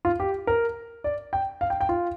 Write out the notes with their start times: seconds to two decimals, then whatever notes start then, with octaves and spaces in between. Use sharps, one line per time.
0.05 F4
0.20 G4
0.47 A#4
1.04 D5
1.33 G5
1.61 F5
1.70 G5
1.81 G5
1.89 F4